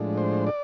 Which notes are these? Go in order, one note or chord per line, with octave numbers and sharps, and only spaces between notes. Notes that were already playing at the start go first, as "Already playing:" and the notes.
Already playing: A2 F3 G#3 D4
C5
D5